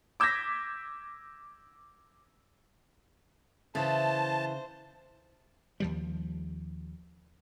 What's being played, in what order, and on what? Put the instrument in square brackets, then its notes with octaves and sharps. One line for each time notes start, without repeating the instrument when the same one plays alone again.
[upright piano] D6 E6 G6 G#6 A#6 B6
[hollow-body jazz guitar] C#3 [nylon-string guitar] E3 [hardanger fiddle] C5 [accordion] A5
[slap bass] D#2 F3 G3